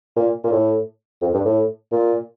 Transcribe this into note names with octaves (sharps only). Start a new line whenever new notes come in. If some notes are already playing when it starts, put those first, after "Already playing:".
A#2
A#2
A2
F2
G2
A2
A#2